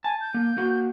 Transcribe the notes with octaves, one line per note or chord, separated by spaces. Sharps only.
G#5 A5
G6
A#3
A#3 F#4